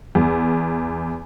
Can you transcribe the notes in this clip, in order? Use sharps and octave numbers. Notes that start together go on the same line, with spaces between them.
E2